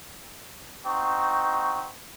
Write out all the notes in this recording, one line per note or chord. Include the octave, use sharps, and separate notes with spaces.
C4 D#4 F#4 C#6